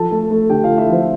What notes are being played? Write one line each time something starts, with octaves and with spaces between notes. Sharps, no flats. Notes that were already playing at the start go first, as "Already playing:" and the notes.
Already playing: F3 A4 A5
A3
A3
D3 G4 G5
F4 F5
A3
E4 E5
F3 C4 C5